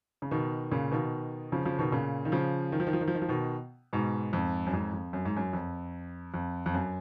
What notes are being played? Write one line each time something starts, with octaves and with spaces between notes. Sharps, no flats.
C#3
B2 D#3
A#2 C#3
B2 D#3
C#3 F3
C#3 F3
B2 D#3
A#2 C#3
D#3
C#3 F3
D#3
F3
D#3
F3
D#3
F3
D#3
F3
B2 D#3
G#2 B2
F2 G#2
F#2
F2 G#2
F2
F#2
G#2
F#2
F2
F2
F2
F#2